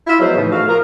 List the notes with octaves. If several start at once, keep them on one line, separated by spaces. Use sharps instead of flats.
E4 F4
F3 F#3 G#3 B3 C5
A2 C#3 E3 F3 D#4
A3 F#4 F5
F3 A#4